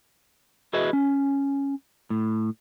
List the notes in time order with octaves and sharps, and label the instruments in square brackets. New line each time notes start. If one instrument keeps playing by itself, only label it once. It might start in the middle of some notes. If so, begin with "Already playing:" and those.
[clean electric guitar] E4 F#4 G#4 B4 D#5 E5
C#4
A2